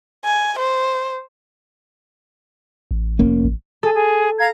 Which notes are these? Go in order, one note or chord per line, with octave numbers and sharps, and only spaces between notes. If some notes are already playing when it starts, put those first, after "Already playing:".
G#5
C5
A1
F1 A#3 C#4
A1
G#4 A4
G#4
F5 A#5 G#6